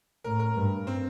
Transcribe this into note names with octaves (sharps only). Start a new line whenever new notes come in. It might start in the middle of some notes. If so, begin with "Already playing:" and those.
A2 A#4
A#4
G2
C4